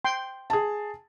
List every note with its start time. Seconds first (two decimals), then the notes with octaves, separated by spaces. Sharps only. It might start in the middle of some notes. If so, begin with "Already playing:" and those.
0.05 G5 C6
0.50 G#4 A5